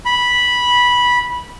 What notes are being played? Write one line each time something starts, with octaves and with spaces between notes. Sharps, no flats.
B5